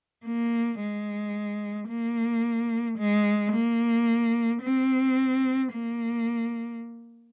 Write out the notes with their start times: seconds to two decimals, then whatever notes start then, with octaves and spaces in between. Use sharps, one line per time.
0.25 A#3
0.80 G#3
1.89 A#3
2.98 G#3
3.53 A#3
4.62 C4
5.73 A#3